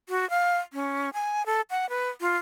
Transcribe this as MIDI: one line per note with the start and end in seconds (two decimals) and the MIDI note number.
0.09 0.28 66
0.30 0.57 77
0.73 1.10 61
1.14 1.45 80
1.46 1.61 69
1.71 1.89 78
1.89 2.09 71
2.21 2.36 65